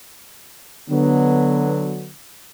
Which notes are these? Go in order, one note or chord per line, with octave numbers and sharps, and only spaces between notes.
D3 F#3 B3